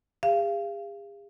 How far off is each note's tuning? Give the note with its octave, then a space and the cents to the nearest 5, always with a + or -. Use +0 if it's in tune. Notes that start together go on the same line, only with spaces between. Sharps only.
G#4 -45 F5 -30